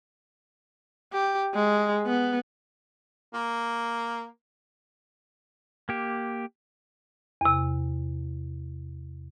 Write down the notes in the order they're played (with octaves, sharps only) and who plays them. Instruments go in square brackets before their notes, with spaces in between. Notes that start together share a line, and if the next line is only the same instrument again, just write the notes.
[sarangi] G4
G#3
B3
[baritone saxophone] A#3
[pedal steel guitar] A#3 G4
[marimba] E2 C3